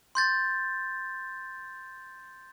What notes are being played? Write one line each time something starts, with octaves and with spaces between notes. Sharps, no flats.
C6 G6 A6